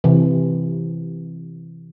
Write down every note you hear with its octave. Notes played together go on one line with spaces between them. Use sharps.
C3 E3